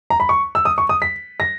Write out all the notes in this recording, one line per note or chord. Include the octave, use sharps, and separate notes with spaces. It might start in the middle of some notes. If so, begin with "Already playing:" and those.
A#5
B5
C#6
E6
D#6
C#6
D#6
B6
A#6